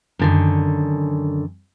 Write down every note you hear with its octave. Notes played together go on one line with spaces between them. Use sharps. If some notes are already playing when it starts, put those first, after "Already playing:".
F#2 D3 D#3